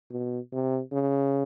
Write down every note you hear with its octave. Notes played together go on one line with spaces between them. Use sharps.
B2
C3
C#3